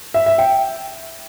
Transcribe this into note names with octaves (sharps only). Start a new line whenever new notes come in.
E5
E5
G5